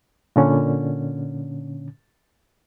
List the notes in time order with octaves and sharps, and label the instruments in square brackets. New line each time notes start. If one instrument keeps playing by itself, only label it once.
[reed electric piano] A#2 D3 C#4